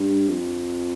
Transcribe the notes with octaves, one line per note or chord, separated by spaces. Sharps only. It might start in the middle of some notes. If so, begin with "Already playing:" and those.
Already playing: G2
F2